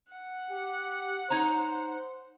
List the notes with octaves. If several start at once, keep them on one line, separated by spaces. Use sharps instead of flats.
F#5
G4
D#4 C5 C#5 A#5